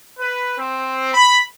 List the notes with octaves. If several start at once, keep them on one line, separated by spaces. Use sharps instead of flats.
B4
C4
B5